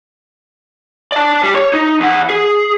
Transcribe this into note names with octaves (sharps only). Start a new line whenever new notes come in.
D5 A5
G3
C#5
D#4
E2 F#5
G#4